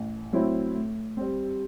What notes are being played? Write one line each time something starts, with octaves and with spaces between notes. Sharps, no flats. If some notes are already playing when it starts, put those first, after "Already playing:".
Already playing: A1
A2 F#3 C4 E4
A2
G3 C4